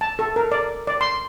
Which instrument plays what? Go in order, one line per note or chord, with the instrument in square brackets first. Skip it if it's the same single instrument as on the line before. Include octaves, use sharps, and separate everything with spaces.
[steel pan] A5
A4
A#4
D5
D5
C6